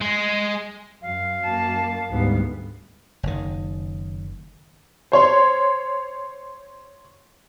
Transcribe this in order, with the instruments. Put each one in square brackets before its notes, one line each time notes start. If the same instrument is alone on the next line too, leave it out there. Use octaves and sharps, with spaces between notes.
[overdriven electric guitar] G#3
[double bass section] F#2 [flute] F5
[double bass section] F#2 [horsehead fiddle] A#3 A5
[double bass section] D2 G#2 G3 [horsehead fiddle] B3
[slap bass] F#1 D#3
[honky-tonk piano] C5 C#5 C6